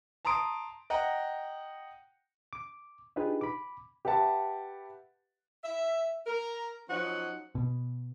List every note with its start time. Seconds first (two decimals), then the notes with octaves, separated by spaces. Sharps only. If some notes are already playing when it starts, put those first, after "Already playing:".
0.25 A5 A#5 C6 D#6 D7
0.90 D#5 F#5 G5 A#5
2.53 D6
3.16 D4 D#4 F4 G4 G#4 B4
3.41 B5 D6
4.05 G4 B4 E5 F#5 A5
5.63 E5
6.27 A#4
6.89 F3 F#3 C#4 D#4 F#5
7.55 B2